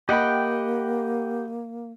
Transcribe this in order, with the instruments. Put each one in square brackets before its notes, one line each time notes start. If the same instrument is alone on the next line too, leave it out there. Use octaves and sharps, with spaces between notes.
[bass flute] A#3 [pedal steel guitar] G4 F#5 G5 [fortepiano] D#5 B5